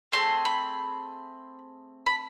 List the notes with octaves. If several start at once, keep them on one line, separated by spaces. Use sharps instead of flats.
A3 C4 G#4 C6
B5
B5